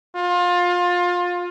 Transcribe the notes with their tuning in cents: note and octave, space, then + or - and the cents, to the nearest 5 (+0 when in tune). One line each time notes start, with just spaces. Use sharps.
F4 +25